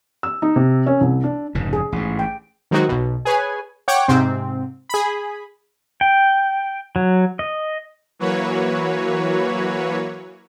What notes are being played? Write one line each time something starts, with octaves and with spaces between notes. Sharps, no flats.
E6
D#4
C3
C#4
C2
D4
F1 G#2 C#3
G#4
A1 G#2
G5
D#3 F#3 G#3 C4 D#4 F#4
B1 B2
G#4 B4 C#5 G#5
C#5 F#5 G5 C#6 D6
G#2 C3 C4
G#4 B5
G5
F#3
D#5
E3 F#3 A#3 F#4 B4 C#5